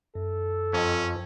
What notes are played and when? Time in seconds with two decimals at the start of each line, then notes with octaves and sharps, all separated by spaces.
0.15 F#2 A4
0.73 F2 C#4 D#5 G#5